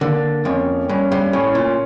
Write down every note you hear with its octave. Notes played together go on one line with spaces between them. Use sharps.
D3 A#3
F2 C#4
G2 C#4
G2
A2 C#4
A#2